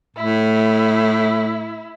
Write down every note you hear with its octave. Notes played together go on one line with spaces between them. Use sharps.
A2 E4